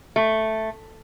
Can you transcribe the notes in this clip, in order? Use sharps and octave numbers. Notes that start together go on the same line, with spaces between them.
A3